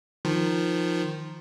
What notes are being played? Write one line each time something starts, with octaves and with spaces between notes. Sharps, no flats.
D#3 F3